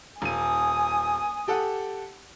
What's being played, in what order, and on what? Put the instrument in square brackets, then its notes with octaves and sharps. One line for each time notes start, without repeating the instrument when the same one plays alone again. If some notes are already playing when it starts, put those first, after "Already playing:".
[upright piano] D#1 D#7 [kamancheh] G#5 D#6
[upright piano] G4 A4 F#5